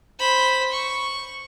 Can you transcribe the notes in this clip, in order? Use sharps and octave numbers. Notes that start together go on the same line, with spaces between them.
C5 B5
C#6